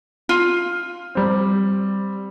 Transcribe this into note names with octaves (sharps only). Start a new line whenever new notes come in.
F4
G3 C4